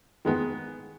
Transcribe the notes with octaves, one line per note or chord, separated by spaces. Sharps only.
D#3 G#3 B3